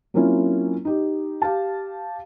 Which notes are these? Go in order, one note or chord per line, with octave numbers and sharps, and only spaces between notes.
F#3 A#3 C4 C#4 E4 F4
D#4 G4
G4 F5 A5